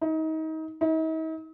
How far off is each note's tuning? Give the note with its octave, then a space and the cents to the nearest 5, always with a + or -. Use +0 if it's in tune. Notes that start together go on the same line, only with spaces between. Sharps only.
D#4 +30
D#4 +45